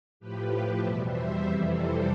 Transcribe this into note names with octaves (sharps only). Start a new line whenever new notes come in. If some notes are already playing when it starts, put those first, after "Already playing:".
A2 F3 G4 B4
E2 B2 G3 C5 E5
C5 E5
F2 C3 E3 G3 C5 E5
A4 C5